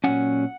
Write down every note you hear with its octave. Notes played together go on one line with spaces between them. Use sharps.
A#2 F#3 C#4 F#5